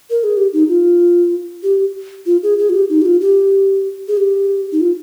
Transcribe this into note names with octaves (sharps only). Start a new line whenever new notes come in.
A#4
G#4
G4
D#4
F4
G4
F4
G#4
G#4
F4
G4
D#4
G4
F4
G4
G#4
G4
D#4
F4